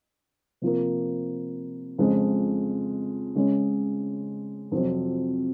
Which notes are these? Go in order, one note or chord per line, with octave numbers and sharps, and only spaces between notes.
C3 F3 A#3
F2 C#3 G#3
C#3 G#3 C#4
F2 C3 F#3 C4